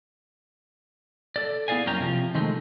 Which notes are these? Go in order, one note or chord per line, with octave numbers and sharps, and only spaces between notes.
A4 D5
B3 E4 G#4 D5 F5 G#5
F#2 A#3 C#4 G5 A#5
C3 F3
D#3 G#3 A3 C4 D#4